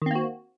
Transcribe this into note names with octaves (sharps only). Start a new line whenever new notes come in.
D#3 A#3 C4 F#4